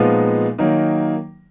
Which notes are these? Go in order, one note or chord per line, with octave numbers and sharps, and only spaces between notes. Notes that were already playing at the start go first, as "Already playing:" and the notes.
Already playing: A#2 F3 G#3 B3 D#4
D#3 F#3 A#3 D#4